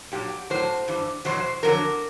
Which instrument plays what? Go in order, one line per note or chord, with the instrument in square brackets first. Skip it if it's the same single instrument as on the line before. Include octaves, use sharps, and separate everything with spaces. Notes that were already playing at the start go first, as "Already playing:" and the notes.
[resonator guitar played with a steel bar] A#2 F#3 G4
A2 F#3 C5
G2 E3 G3
E2 B2 F#3 C5
F2 D3 F#3 A#4